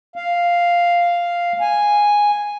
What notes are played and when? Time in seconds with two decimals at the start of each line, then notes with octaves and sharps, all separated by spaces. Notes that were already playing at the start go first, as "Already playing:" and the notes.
0.16 F5
1.61 G#5